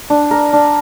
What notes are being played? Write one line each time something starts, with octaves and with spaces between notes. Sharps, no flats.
D4
A#4
D4